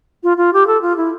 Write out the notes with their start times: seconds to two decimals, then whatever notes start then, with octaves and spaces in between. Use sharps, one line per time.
0.23 F4
0.37 F4
0.53 G4
0.67 A4
0.82 F4
0.97 E4